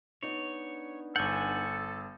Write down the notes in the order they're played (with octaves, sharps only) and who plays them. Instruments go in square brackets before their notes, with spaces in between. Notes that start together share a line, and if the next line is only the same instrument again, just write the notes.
[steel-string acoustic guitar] B3 D4 D#4 [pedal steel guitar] C#5
[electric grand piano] G1 G6 [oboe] A4 [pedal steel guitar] F#5 G#5